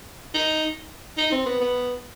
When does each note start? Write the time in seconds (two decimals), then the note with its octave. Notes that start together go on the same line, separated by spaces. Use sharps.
0.34 D#4
1.18 D#4
1.32 C4
1.46 B3
1.61 B3